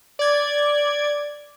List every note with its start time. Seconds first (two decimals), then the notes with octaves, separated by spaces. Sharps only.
0.19 D5 G#6